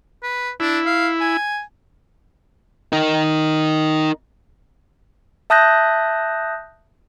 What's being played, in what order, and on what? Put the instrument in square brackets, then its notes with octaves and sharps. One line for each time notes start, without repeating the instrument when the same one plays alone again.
[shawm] B4
[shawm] D4 [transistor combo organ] E4
[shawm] F5
G#5
[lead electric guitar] D#4 A#4
[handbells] E5 A5 D#6 F#6 G6 A#6